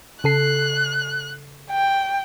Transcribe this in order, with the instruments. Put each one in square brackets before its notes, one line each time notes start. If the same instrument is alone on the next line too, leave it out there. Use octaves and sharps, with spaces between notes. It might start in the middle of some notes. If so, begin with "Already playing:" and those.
[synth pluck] C#3 A4 C7 [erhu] F#6
[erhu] G5